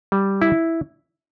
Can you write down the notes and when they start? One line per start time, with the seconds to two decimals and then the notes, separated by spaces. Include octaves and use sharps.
0.12 G3
0.42 E4